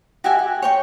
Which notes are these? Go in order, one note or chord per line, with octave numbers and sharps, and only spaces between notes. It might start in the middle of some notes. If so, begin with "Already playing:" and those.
F#4 G4 E5 G#5
F#4
C#5 G5 C#6